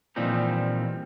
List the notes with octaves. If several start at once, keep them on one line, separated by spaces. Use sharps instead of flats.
A#2 E3 F3 G3 C4 D#4